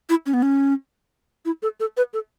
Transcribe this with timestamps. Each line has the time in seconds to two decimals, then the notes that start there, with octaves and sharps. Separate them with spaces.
0.10 E4
0.26 C#4
0.34 B3
0.42 C#4
1.45 E4
1.63 A4
1.80 A4
1.97 B4
2.14 A4